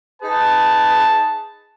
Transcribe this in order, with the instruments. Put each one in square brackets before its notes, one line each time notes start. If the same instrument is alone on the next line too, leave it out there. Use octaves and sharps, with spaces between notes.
[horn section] D#4 G#4 B4 [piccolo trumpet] A5